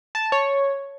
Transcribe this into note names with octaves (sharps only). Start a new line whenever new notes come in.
A5
C#5